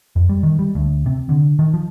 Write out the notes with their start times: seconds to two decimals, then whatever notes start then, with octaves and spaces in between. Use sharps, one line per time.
0.16 F2
0.29 G3
0.43 D#3
0.59 G3
0.75 D2
1.06 C3
1.29 D3
1.59 D#3
1.74 F3